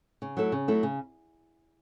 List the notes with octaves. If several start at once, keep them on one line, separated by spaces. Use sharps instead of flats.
C#3
F#3 A3 E4 A4
C#3
F#3 A3 E4 A4
C#3